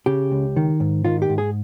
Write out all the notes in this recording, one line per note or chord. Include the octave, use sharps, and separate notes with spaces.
C#3 G4
C#2
D#3
G#2
D#3 F4
G4
G#2
G#4